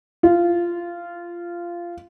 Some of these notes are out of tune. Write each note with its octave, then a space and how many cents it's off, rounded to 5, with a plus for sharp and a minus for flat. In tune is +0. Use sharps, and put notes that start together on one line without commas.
F4 -15